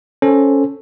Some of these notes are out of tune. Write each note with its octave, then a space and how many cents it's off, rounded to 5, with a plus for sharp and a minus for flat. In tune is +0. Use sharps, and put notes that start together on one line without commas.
C#4 +0 A4 +0 C5 +0